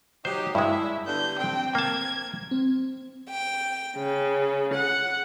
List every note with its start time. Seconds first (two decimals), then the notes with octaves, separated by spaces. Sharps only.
0.25 F#3 D#4 G4 C5
0.55 G2 G#3 E4 E5
1.06 D3 G3 B3 G6
1.38 C4 G5
1.75 A#3 A5 G#6
2.51 C4
3.31 G5
3.97 C#3
4.75 F#5